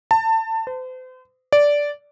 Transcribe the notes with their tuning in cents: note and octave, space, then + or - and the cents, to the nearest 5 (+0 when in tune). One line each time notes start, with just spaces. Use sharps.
A5 +25
C5 -40
D5 -10